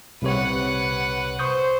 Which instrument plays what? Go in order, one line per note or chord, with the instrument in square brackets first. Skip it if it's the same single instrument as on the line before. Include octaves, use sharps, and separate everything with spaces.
[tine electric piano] C2 C3 C#5 [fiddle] B4 F#5
[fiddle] C5 [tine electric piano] C#6 D#6 G6